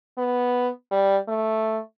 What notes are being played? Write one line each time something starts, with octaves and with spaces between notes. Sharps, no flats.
B3
G3
A3